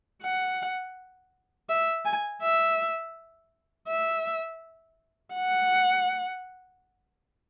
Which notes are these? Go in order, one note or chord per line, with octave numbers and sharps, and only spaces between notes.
F#5
E5
G#5
E5
E5
F#5